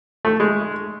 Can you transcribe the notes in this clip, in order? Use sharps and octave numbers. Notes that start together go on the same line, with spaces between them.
A3
G#3